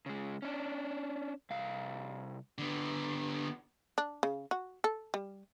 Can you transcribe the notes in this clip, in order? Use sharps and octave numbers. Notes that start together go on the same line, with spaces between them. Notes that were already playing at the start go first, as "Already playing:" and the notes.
C#3 G#3
C#4 D4
C2 F5
D3 B3
D4
C#3
F#4
A4
G3